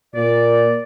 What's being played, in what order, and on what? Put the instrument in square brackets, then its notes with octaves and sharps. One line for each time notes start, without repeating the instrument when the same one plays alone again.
[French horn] A#2 [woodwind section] D5